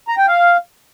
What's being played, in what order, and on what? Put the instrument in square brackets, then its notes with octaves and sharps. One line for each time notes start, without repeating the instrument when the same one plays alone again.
[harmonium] A#5
G5
F5